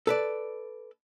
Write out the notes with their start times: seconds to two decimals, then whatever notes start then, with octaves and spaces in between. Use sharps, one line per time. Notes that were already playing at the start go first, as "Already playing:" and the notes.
0.07 A4 B4 D5